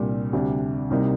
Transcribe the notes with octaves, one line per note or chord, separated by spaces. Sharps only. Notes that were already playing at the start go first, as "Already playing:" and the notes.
Already playing: C2 A#2 G3 D4
D2 C3 G3 D4
C2 C3 G3 A#3 D#4